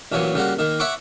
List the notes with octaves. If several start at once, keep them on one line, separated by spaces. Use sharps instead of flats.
A1 A#2 E3 F#3 C#5
C#3 G3 A#3 F#4
D#3 A#3
C#5 E5 F#5 B5 C#6 D6